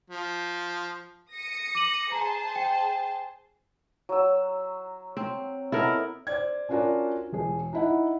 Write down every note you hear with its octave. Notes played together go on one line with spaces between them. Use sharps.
F3
D#6 A#6 C#7
D6 D#7 F#7
G#4 C5 A5 A#5
G5
F#3 E6
C4
B3 E4 A4 A#4 D#5
C5 D5 G#6
C#4 D4 F4 F#4 A#4 D5
E1 G#4
D#4 E4 F#5